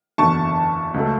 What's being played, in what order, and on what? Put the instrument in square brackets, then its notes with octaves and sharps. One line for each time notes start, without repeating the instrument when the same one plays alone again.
[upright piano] F#1 E2 D3 F#3 A5 C#6
C#2 C#3 F#3 A3